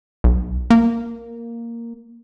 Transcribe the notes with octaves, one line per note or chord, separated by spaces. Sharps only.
B1
A#3